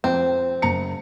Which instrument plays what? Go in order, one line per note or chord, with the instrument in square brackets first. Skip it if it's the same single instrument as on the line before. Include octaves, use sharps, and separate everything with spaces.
[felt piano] F2 [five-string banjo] C4
[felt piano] F#1 A#5 C#7